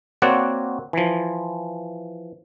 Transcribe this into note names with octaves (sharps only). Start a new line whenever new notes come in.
A#3 C4 F#4 C#5 D5 F#5
E3 F3